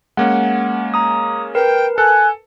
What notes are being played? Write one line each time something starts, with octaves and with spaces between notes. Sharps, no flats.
G#3 A#3 C#4 F#5
A#5 D#6
A#4 B4 G5
A4 G#5 F#6